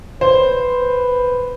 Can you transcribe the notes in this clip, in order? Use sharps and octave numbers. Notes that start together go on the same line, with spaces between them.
B4 C5